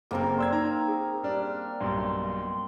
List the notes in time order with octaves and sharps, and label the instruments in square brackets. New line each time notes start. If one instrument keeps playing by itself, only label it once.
[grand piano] F#1 [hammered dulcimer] A#3 C4 A#4
[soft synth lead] D5 [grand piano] C6 E6 G#6
[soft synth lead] D#4 [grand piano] A#5
[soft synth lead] G#4
[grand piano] G3 D4 [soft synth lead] F6
[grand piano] B1 G2 [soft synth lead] C6